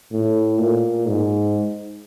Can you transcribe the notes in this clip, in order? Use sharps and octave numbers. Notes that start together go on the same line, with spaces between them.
A2
A#2
G#2